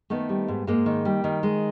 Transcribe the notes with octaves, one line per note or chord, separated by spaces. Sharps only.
D#3 A3 B3
G3
G#2
G#2 G#3 A#3
D#3
G3
D#3
G#3